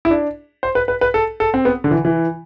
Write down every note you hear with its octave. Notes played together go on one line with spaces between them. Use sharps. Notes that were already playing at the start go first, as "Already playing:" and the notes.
E4
D4
C5
B4
B4
B4
A4
A4
C4
B3
D3
E3
E3